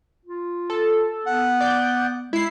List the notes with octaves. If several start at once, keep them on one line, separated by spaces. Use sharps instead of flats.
F4
A4
B3 F#5
D5 G6
G#3 E4 C7